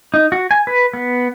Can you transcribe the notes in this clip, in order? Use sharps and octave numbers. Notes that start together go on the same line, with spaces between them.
D#4
F#4
G#5
B4
B3